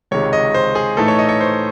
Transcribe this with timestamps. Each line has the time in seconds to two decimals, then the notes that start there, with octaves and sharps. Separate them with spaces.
0.11 C#2 C3 D#3 G#3 C#5
0.33 D#5
0.54 C5
0.75 G#4
0.97 A2 E3 A3 D#4 A4
1.08 C#5
1.19 D#5
1.29 C#5
1.40 C5